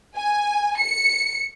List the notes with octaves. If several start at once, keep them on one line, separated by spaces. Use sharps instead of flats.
G#5
C#7